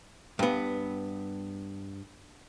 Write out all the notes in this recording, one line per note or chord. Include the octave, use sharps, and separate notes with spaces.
G2 B3